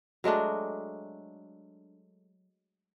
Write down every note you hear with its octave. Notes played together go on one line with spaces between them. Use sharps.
F#3 G#3 A3 D4